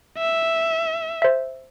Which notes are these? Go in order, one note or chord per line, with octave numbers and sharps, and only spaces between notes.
E5
C5 E5